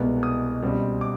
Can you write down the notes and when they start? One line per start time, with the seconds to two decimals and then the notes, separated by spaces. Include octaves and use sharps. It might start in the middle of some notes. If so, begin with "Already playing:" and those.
Already playing: C2 B2 G#3 B3
0.23 D#6
0.62 C#2 B2 G3 C4
1.01 D6